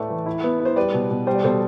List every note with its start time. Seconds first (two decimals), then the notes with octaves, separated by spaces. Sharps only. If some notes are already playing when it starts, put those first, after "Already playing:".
Already playing: A2 A3 B4 D5
0.10 E3
0.26 E4
0.44 B3
0.60 E4
0.65 C5
0.76 G3 B4 D5
0.94 B2
1.11 B2
1.27 G3 C5
1.35 D5
1.44 B2 A4 C5